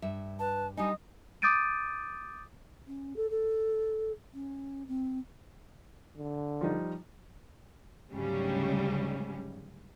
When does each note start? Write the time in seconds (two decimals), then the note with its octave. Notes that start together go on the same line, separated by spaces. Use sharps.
0.02 G2 E5
0.39 B4 A5
0.77 G3 D4 D#4 D#5 G#5
1.42 D6 D#6 G6 A6 D7 D#7
2.87 C#4
3.16 A4
3.30 A4
4.33 C#4
4.88 C4
6.17 D3
6.61 F3 G3 D#4
8.11 D2 G#2 C#3 F#3 G3 C#4